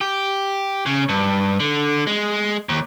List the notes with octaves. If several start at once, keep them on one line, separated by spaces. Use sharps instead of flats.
G4
C#3
G2
D3
G#3
D#2